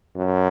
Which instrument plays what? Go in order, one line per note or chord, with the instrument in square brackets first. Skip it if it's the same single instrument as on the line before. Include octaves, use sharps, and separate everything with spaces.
[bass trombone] F#2